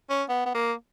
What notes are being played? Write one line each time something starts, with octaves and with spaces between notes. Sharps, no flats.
C#4
B3
B3
A#3